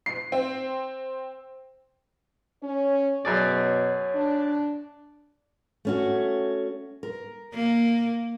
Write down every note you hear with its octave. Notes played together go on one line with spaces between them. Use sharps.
C7
C4
C#4 C#5
F#2 B2 G#4 D5
D4
A3 C#4 F#4
A#4
A#3